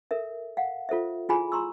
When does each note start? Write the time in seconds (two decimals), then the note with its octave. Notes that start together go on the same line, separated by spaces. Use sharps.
0.11 A4 A#4 E5
0.57 F5 F#5
0.89 F4 A4 C5 E5
1.29 E4 F4 G#4 G#5 B5
1.52 A#5 C6 C#6 E6